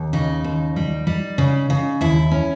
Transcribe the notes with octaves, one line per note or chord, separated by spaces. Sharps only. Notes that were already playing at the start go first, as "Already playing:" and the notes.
Already playing: D#2
C#3 D#4
D#2
G3
G3
C#3
C#3
D#2 E4
C#4